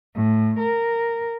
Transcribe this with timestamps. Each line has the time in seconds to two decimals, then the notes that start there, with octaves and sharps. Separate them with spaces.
0.14 A2
0.58 A#4